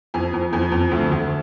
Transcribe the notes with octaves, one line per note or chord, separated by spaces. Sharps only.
F2 G#5
F2
F2 G#5
F2
D2
D2